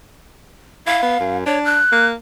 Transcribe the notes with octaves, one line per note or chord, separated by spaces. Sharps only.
E4 F5
B3
F#2
D4 C#5
F#6
A#3